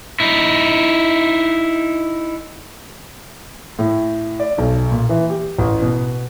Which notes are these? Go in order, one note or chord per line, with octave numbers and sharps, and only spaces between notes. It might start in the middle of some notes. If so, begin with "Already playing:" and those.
D#4 E4
A2
D5
B1
A#2
E3
G4
A1
B2